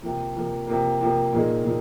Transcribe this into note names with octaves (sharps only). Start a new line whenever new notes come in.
C3 F3 A#3
C3 F3 A#3
C3 F3 A#3
C3 F3 A#3
A#2 F3 A#3 D#4 G#4
A#2 F3